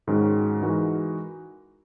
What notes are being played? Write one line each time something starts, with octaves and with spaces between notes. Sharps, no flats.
G#2 D#3 G#3 C#4 F#4
E3 G#3 D#4 F#4 A#4